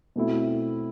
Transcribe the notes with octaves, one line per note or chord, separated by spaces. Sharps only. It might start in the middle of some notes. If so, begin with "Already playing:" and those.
B2 A3 C4 E4